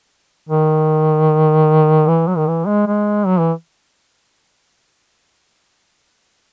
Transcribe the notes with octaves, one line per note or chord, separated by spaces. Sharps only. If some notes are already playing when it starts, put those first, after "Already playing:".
D#3
E3
F#3
D#3
E3
G#3
G#3
F#3
E3